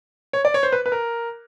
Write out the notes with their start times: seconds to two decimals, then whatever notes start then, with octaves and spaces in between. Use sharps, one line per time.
0.33 C#5
0.45 D5
0.54 C#5
0.63 C5
0.73 B4
0.86 B4
0.92 A#4